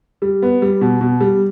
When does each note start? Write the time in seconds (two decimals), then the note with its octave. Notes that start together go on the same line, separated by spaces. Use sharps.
0.22 G3
0.42 B3
0.62 G3
0.81 B2
1.01 B2
1.21 G3